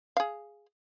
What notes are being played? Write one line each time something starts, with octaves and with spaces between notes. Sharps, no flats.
G#4 F5